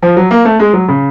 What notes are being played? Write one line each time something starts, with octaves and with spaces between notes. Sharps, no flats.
F3
F#3
A#3
A3
G#3
F#3
C#3